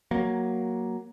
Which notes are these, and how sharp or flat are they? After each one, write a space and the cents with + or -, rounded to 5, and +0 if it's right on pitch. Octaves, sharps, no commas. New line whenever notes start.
F#3 +0 A#3 +5